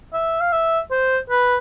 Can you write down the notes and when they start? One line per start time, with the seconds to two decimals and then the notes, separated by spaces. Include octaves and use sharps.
0.13 E5
0.40 F5
0.52 E5
0.91 C5
1.30 B4